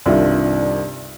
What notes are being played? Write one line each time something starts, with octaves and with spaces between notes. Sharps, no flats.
C2 G2 D#3 F4 E5